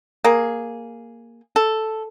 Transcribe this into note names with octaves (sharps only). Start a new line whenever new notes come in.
A#3 G#4
A4